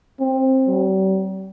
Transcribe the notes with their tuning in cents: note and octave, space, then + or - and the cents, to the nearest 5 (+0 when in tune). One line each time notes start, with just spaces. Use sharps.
C4 +15
G3 -45